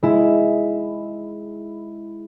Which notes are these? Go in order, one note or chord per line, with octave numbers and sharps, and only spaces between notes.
G#3 E4